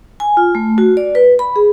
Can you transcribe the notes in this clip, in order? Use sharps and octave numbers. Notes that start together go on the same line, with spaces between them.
G#5
F4
A3
F#4
D5
B4
B5
G#4